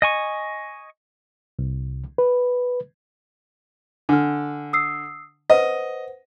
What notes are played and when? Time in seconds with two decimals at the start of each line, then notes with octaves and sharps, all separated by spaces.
0.02 D#5 G#5 C#6
1.59 C2
2.18 B4
4.09 D3 G#5 F6
4.73 D#6 E6 C7
5.50 B4 C5 D#5 F#5